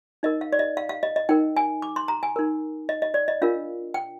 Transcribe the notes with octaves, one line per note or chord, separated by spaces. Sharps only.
D#4 A#4 D#5
F5
D5
D#5
F5
F5
D#5
D#5
D#4 A#4 G5
G#5
D6
C6
A#5
G#5
D#4 A#4
D#5
D#5
D5
D#5
D4 F4 A#4 F5
G5